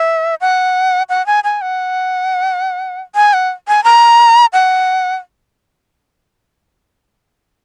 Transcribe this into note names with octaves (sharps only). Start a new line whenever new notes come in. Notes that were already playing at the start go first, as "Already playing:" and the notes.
Already playing: E5
F#5
F#5
G#5
G#5
F#5
G#5
F#5
G#5
A#5
F#5